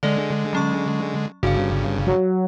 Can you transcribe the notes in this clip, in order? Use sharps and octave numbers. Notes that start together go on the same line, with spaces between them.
D3 G#3 A4 D5
F#3 C#4 C#6
G1 G2 C#3 F#4 F5
F#3